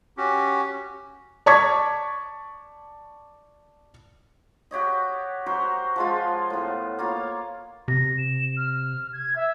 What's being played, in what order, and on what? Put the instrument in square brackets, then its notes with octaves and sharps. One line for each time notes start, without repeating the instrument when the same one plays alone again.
[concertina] C#4 F#4 G4
[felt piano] D5 A5 C#6 D6 G#6 B6
[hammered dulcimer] F#4 G4 C#5 D#5
F#4 G4 A#4 C5
F3 G#3 F4
A2 B3
A#3 F4 C#5
[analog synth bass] C3 [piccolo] A#6
[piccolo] E7
F6
G#6
E5